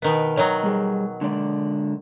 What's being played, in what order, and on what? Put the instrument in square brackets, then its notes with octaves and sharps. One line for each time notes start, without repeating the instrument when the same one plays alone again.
[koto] B2 D#3 B3
[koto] D#3 F#3 [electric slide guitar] C#5 D#5
[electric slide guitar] G3 G#4
D3 G#3 D5